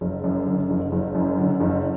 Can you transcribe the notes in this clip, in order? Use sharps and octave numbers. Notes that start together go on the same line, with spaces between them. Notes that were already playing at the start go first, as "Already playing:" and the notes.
F#1
F#2
D3
F#1
F#1
F#2
D3
F#1